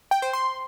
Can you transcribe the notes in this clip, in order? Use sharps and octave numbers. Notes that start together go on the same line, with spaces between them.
G5
C5
C6